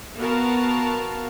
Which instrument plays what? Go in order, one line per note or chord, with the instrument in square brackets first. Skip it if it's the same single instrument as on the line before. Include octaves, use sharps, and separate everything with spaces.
[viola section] B3 F#4 A#4 F5 A5